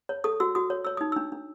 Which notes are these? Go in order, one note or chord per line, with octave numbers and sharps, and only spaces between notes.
C#5
A4 D#6
F#4 E6
F#4 D#6
C#5
C#5 E6
D#4 D#6
D4 E6
D4